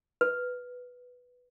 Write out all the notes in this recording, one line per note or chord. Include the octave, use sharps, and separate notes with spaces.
B4